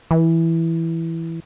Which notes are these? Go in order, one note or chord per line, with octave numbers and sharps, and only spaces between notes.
E3